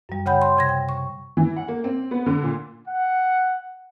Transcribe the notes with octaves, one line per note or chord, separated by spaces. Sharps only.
F#2 G3
C#3 C#5 F#5 G5 B5 G6
C6
C3 G#6 A#6
G5
C#6
E3
F#5
A#3
C4
B3
D3
A#2
F#5